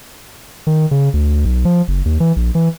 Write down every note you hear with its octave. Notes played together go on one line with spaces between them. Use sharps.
D#3
C#3
D2
B1
F3
F#1
D#2
E3
A#1
E3